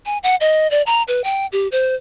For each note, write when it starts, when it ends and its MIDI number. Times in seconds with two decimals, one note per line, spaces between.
0.06 0.18 80
0.23 0.36 78
0.41 0.69 75
0.71 0.82 74
0.87 1.03 82
1.08 1.22 71
1.24 1.46 79
1.52 1.68 67
1.72 1.95 72